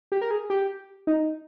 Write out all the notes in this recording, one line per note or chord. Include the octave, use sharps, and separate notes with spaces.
G4
A#4
G#4
G4
D#4